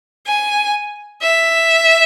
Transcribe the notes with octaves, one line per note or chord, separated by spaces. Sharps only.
G#5
E5